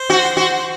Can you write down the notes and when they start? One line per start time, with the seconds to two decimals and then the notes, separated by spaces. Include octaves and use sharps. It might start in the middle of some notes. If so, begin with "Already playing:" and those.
Already playing: C5
0.10 F#4
0.37 F#4